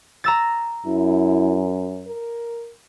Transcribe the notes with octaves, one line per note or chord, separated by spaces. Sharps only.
A#5 E6 A6
F#2 E4
A#4